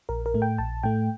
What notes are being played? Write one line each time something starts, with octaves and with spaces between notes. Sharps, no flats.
A#1 A#4
A#4
A2 A3
G5
A#1 A5
A2 A3 G5